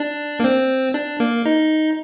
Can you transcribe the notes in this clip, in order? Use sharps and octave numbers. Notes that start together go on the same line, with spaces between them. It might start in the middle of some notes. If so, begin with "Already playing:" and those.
Already playing: D4
A#3
C4
D4
A#3
D#4